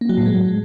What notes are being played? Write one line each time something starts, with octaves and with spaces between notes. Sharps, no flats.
A#3
F#3
A2
G#3